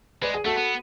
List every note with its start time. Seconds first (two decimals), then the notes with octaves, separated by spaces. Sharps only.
0.22 G#3 B4 D5
0.34 G#4
0.45 A3 F#4 A4
0.56 B3